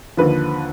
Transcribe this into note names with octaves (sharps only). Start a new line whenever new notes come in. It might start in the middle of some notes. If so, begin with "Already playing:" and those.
D#2 D3 F3 B4